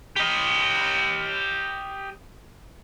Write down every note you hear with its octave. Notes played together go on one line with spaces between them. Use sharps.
G4 D#5